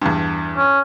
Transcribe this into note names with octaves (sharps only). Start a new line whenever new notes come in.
E2 G2
C#4